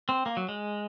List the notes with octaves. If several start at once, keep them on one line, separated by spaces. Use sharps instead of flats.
C4
A#3
F#3
G#3